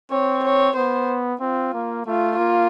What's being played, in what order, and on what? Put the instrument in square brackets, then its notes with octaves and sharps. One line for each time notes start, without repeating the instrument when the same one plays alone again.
[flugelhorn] C4 [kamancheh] C#5
[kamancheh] C#5
[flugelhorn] B3 [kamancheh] C5
[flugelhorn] C4 [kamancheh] F4
[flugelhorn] A#3
[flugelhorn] A3 [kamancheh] F4
[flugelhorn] A#3 [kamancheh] F4